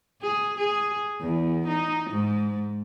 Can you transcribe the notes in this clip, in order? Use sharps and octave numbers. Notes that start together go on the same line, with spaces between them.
G#4
G#4
E2
D#4
G#2